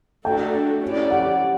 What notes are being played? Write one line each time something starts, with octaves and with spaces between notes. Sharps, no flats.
A3 D4 F#4 A4 G5
C#4 E4 G4 D5
F#5